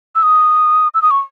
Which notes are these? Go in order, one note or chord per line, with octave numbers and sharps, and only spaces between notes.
E6
D#6
E6
D#6
C#6